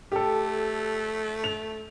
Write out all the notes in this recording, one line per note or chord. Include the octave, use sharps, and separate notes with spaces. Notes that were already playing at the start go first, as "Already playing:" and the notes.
A3 G4 A4
F7